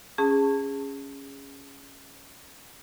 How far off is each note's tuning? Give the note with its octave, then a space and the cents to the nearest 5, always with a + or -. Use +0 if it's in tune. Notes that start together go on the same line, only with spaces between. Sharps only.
C#4 +0 G#4 -15 A5 +20